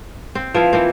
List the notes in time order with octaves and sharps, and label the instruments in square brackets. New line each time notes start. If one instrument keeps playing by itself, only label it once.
[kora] C4
[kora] F3 E4 F5 [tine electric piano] F4 B4
[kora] E3 A#3 C4